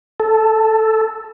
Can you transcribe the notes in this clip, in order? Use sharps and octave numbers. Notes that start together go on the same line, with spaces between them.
A4